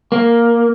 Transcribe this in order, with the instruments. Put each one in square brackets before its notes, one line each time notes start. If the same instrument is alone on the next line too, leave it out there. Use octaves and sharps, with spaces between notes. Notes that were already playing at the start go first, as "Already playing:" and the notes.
[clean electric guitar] A#3